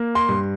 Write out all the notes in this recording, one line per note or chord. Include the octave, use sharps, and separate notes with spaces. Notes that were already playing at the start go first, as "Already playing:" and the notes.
Already playing: A#3
C6
G2